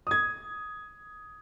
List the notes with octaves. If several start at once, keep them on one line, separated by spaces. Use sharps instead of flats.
D#6 G#6